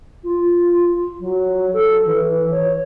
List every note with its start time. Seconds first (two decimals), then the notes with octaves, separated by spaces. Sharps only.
0.24 F4
1.20 F#3
1.73 A4
2.06 E3
2.51 C#5